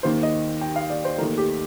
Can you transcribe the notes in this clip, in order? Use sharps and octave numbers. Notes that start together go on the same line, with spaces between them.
D#2 D#3 A#3 C5
D#5
G5
F5
D5
C5
D#2 D#3 A3 A#4
G4